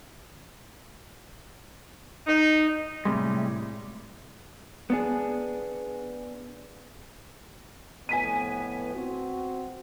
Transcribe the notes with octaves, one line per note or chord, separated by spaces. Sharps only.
D#4
A2 C3 G3 G#3
B3 D4 G#4
F2 A2 B3 G#5 B6 D#7
C4 F#4